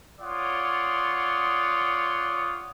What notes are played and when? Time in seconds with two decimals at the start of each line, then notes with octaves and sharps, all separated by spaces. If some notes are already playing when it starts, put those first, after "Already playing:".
0.20 F4 C#5 D5 F#5 C6 D#6